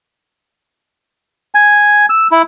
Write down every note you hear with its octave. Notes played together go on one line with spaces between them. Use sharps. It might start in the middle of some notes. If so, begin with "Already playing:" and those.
G#5
E6
E4